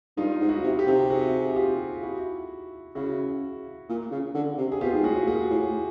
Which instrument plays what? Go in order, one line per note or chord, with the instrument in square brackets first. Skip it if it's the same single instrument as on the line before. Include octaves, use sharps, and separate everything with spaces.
[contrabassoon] G2 [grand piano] D#4 F4
[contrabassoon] G#2
[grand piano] E4 F#4
[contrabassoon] C3
[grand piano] F4 G4
[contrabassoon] C3
[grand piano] F#4 G#4
F4 G4
E4 F#4
[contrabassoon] C#3 [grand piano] E4 F#4
[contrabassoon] A#2
C#3
D3
C3
[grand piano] G#4
[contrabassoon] B2 [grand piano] F4 G4
[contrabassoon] G#2
[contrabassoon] A2 [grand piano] F#4 G#4
[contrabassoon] A#2 [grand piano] F#4 G#4
[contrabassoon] A2